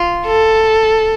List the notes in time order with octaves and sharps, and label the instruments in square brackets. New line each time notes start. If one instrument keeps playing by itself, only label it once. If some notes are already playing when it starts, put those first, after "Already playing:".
Already playing: [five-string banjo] F4
[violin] A4